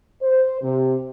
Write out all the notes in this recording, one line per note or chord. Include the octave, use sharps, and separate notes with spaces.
C5
C3